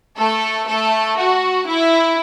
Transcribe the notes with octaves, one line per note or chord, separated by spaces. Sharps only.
A3 A4
A3 A4
F#4
E4